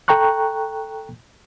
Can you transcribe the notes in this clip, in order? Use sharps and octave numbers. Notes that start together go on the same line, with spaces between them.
A4 G5 A#5 C#6 F#6